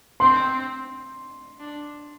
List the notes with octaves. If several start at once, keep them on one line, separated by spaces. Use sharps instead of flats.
C4 C6
D4